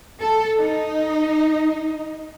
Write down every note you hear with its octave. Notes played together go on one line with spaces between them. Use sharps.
A4
D#4